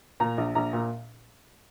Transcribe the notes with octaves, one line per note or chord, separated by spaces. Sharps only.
A#2 A#5
A#1
A#1 A#5
A#2